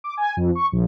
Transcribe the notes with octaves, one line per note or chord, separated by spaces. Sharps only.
D6
G#5
F2
C#6
A#1